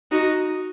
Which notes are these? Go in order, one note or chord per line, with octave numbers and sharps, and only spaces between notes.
D#4 F#4